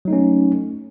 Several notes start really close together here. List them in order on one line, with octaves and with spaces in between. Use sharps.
F#3 D#4 A3 C#4